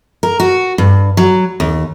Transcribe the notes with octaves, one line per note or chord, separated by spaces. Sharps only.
A#4
F#4
G2
F#3
D#2